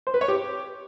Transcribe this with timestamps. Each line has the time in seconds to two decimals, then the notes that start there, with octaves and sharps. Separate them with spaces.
0.07 C5
0.14 B4
0.21 C#5
0.28 G4